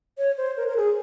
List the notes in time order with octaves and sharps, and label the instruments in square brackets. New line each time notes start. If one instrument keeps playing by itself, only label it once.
[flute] C#5
C5
A#4
A#4
G#4